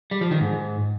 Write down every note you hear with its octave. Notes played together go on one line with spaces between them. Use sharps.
G3
F3
D#3
G#2